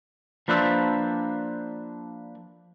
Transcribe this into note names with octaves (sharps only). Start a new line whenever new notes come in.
F3 A#3 D4 B4 C5 E5